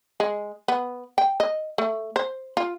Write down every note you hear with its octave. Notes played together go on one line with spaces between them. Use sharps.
G#3
B3
G5
D#5
A3
C5
F4